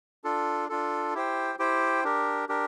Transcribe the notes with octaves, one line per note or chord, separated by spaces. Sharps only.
D4 F4 A4
D4 F4 A4
E4 G4 C5 G5
E4 G4 C5 G5
D4 G4 A#4
D4 G4 A#4